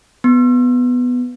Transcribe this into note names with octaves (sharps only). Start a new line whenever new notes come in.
B3